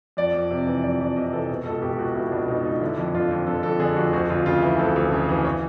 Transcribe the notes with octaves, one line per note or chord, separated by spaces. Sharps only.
F2 D5
F2
C3
E3
F2 D5
F2 D5
C3 D#5
E3 A4
B2 G#4
C#2 A4
B2 G4
C#2 F#4
B2 E4
C#2 D4
B2 D#4
C#2 D#4
D3 E4
F2
D3 F4
F2
D3 A4
F2 A4
D3 G#4
F2 F#4
D2 F#4
D2 F4
C#3 F4
E3 E4
D2 A4
D2
C#3
E3
C#5